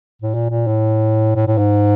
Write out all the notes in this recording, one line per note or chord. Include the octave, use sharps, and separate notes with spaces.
A2
A#2
A#2
A2
A2
A2
G#2